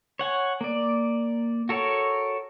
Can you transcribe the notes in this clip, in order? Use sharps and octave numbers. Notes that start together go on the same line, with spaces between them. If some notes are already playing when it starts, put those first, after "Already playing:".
C#5 F#5 G#5
A#3 D5
F#4 A4 A#4 C#5